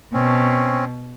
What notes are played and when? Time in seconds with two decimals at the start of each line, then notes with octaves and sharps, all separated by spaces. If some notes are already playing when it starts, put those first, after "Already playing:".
0.14 B2 C4 C#4